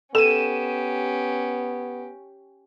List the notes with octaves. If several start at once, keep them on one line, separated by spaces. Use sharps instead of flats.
B3 C#4 G4 A4 D#7 E7